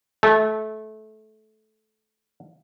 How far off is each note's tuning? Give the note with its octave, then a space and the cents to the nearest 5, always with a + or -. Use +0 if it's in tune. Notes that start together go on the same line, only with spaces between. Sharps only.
A3 -20